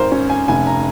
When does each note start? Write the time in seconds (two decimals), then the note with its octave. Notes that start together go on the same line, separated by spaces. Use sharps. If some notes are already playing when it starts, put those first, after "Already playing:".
Already playing: G#1 A#4 C5
0.12 C#4
0.30 G#5
0.48 F1 G#5
0.67 A#5